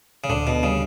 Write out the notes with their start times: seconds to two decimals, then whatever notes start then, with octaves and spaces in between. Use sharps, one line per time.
0.24 C#3
0.29 D2 D3
0.47 B2
0.63 C#3 G3